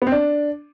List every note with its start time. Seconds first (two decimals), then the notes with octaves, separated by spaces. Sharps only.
0.02 B3
0.07 C4
0.12 D4